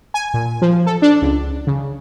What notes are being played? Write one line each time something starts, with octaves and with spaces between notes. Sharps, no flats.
G#5
A#2
F3
A4
D4
C#2
C#3